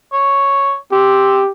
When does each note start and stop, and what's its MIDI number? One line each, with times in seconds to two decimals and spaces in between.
0.13 0.76 73
0.92 1.39 60
0.92 1.51 67